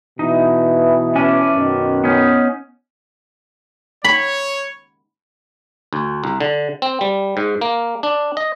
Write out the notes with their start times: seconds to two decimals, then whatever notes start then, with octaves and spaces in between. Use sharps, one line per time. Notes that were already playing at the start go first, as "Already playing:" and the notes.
0.19 B2 E3 D#4
1.16 C#4 D4 G#5
1.54 F#2 B2 D#3
2.04 B3 C#4 D#4
4.04 C#5 B5
5.93 D2
6.24 C2
6.40 D3
6.82 C4
7.01 G3
7.37 G#2
7.61 A#3
8.03 D4
8.37 D#5